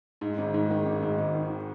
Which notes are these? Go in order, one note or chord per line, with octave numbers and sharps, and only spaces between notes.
G#2
G#1
G#2
D#3
G#1
G#2
G#1
D#3